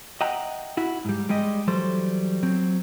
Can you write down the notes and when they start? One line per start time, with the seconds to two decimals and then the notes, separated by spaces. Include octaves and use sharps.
0.21 D#5 E5 F#5 G5 A#5
0.77 E4 F#4
1.05 G#2 G3
1.29 G3 G#3 G4 D#5
1.67 E3 F#3 G3 A4 C5
2.43 F#3 C4